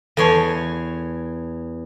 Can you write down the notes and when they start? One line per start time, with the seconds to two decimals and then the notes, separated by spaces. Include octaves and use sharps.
0.17 E2 A4 B4 C#5 A5 C6